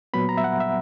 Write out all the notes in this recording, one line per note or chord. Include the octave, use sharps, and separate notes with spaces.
A#2 F#3 B3 B5
A#5
E5
F#5
E5